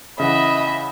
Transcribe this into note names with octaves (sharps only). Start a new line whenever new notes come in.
C#3 E3 D#5 E5 F#5 B5